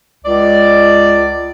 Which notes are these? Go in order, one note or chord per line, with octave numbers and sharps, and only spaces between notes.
C#2 D5